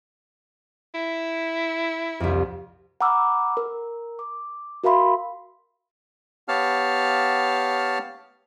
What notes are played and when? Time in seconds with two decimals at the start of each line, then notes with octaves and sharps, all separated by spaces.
0.95 E4
2.20 C2 F2
3.01 F#5 A#5 B5 D6 E6 F6
3.57 A#4
4.19 D6
4.84 F#4 A#4 E5 F5 B5 C6
6.48 B3 G4 C#5 F5 A5 F6